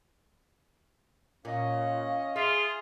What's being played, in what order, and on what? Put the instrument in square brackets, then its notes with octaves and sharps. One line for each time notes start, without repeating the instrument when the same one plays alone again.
[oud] A#2 [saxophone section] C#4 C#5 D#5 [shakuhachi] F5
[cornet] F4 [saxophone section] G#4 [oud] E5